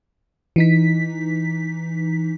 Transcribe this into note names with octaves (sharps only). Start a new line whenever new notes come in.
E3 D#4 B6